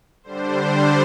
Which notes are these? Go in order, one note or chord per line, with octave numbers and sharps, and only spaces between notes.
D3 G3 D4 C5